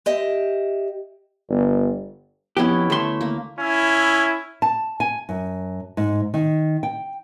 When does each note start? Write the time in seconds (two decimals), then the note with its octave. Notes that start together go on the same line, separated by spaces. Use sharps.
0.06 G4 D#5 E5
1.50 G1
2.57 F2 B3 C#4 E4 G4
2.90 D2 A3 E5 C6
3.21 A#3
3.59 C#4 E4
4.62 A5
5.00 G#5
5.29 F#2
5.97 G#2
6.34 D#3
6.83 G5